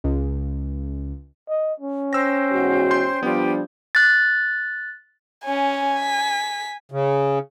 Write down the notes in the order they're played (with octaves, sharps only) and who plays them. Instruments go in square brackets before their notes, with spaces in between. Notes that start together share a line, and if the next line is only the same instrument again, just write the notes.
[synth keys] C#2
[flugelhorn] D#5
C#4
[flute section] C5 G5 [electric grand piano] E6 A#6
[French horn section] E2 G#2 F#4
[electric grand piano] C6 G6
[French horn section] F3 G3 D4 [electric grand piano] B3 F4 [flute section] G4
[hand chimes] F#6 A6
[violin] C#4 [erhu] G#5
[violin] B6
[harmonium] C#3